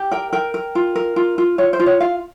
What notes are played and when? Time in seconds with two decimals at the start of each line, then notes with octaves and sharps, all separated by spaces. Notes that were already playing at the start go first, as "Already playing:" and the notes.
Already playing: G4
0.11 A#4 G5
0.33 A#4 G5
0.54 A#4
0.75 F4
0.96 A#4
1.16 F4
1.38 F4
1.58 F4 C#5
1.73 C5
1.80 F4
1.86 C#5
2.00 F4 F5